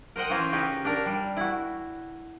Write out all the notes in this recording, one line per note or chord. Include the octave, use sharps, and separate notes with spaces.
A#4 C5 D#5 F#5 G5
E3 C#4 F4 C5 A#5
C#3 C#4 D#4 G4 B4
D4 A#4
G3
E4 F#4